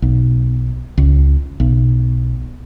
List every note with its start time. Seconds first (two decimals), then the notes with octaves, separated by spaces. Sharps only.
0.02 B1
0.98 C#2
1.60 B1